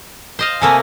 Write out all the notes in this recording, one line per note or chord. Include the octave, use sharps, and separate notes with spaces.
C5 D#5 F5
C3 A3 A#3 G#5